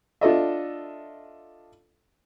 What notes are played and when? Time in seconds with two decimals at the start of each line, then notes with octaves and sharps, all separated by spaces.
0.21 D4 F4 A4 D#5 E5